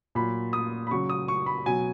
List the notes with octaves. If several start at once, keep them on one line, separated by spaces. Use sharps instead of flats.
A#2 F#3 B5
D#6
B5
C#3 F#3 C#6
D#6
C#6
B5
B2 F#3 G#5